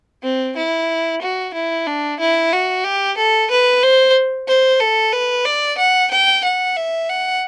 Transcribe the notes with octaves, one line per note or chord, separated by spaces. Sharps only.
C4
E4
F#4
E4
D4
E4
F#4
G4
A4
B4
C5
C5
A4
B4
D5
F#5
G5
F#5
E5
F#5